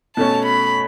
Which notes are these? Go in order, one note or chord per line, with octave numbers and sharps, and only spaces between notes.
B2 A3 C#4 A5
B5